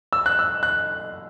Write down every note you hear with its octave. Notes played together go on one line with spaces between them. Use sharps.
E6
F#6
E6
F#6